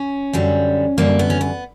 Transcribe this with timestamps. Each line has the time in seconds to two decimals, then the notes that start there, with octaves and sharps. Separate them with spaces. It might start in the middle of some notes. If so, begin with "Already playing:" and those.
Already playing: C#4
0.33 F#2 D3 G3
0.98 F#2 D3 G3 A#3
1.19 B3
1.30 C#4
1.41 B3